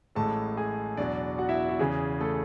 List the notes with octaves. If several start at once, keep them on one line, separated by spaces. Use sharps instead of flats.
A1 A2 G#3 A4 A5
G#4 G#5
E2 B2 F#3 D4 D5
F#4 F#5
E4 E5
F#4
E2 C#3 E3 G#4
A3 A4